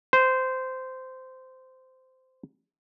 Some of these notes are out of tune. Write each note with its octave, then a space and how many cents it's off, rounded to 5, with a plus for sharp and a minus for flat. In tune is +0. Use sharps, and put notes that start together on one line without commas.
C5 -15